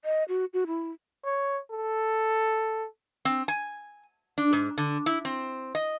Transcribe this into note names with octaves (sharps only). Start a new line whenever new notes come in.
D#5
F#4
F#4
E4
C#5
A4
C4
G#5
D4
G#2
D3
E4
C4
D#5